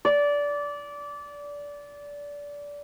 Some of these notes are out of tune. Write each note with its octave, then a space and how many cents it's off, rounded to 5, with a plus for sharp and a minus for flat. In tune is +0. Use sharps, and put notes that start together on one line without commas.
D5 -20